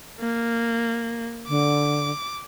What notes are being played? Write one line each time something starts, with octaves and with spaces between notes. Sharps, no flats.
A#3
D3 D6